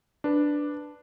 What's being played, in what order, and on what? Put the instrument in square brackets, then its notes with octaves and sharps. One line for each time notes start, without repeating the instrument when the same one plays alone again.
[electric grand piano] D4 B4